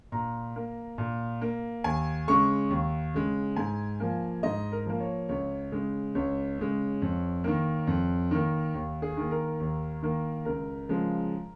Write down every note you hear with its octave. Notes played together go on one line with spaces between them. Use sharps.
A#2 A#5
A#3
A#2
A#3
D#2 G#5
C#3 G#3 C#6
D#2
C#3 G#3
G#2 G#5
F3 A#3
G#2 D#5
A#4
F3 A#3
C#5
C#2 C#5
C#3 G#3
C#2 C#5
C#3 G#3
F2
D#3 A#3
F2
D#3 A#3
D#2
G#4
D#3 A#3
A#4
D#2
D#3 A#3
C#2 A#4
C#3 F3 G#3